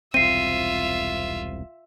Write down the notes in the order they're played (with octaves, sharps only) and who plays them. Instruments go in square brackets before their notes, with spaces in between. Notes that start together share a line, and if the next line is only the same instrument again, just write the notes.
[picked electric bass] E1 C2 C4 [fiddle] F4 E5 [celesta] C7 D#7